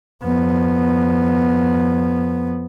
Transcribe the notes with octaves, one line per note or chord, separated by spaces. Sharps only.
F2 B3